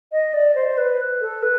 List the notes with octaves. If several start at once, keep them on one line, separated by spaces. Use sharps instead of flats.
D#5
D5
C5
C5
B4
A4
B4